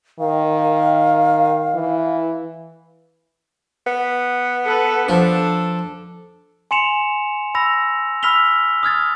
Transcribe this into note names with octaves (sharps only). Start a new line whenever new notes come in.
D#3 F5
E3
B3
A4 B4
F3 D4 A4
G#5 C6 C#7 E7 F7
B5 E6 A#6 F7
B5 E6 F6 B6 F7 G7
D#6 F6 G#6 A6